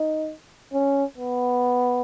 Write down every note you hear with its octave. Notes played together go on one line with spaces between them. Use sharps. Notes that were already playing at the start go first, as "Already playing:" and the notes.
Already playing: D#4
C#4
B3